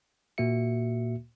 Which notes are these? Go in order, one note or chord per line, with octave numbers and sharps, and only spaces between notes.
A#2 A#3 F#4 E5 C#7